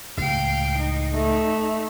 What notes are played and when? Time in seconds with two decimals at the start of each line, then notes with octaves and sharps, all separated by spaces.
0.18 C#2 A2 F5 G5
0.79 D#4
1.15 A3